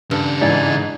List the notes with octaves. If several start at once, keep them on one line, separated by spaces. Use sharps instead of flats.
G2 C#3 A4
G#2 E3 E4 D5 G#5